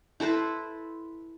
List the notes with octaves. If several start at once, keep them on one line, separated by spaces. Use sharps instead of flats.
E4 A4 B4 C5